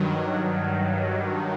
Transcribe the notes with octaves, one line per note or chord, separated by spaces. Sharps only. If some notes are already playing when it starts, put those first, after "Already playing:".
Already playing: G2 D#3 F#3